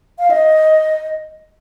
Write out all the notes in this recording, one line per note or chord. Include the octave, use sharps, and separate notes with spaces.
F5
D#5